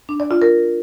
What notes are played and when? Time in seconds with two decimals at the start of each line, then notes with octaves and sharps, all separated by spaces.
0.09 D4
0.20 D5
0.31 F4
0.42 A#4